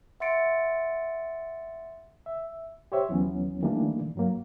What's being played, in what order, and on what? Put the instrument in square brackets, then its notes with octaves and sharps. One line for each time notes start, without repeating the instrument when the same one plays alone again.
[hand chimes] E5 F#5 C6 A6 C#7 D7
[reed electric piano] E5
G4 C5 C#5 E5
D#2 E3 F#3 B3 C#4
D#3 E3 G3 A3 A#3 D4
G2 F#3 A#3